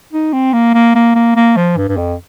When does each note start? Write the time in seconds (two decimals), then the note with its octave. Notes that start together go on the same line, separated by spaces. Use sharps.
0.13 D#4
0.33 C4
0.53 A#3
0.74 A#3
0.95 A#3
1.15 A#3
1.36 A#3
1.57 F3
1.77 G2
1.89 G2
1.97 F2